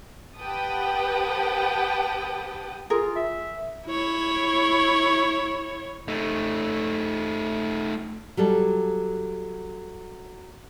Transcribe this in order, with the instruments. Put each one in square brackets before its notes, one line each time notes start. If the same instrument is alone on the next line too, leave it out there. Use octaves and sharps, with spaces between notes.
[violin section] G4 B4 F#5 G5 A5 D#6
[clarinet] F4 [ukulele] G#4 A#4
[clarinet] E5
[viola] E4 C#5
[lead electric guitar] A3 D#4
[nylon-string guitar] F#3 G3 A4